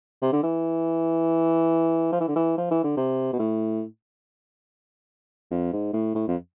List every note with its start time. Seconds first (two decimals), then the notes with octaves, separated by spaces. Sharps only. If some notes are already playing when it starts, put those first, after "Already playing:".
0.22 C3
0.33 D3
0.43 E3
2.12 F3
2.20 E3
2.28 D3
2.36 E3
2.58 F3
2.71 E3
2.84 D3
2.97 C3
3.33 B2
3.39 A2
5.51 F2
5.73 G#2
5.93 A2
6.15 A2
6.28 F2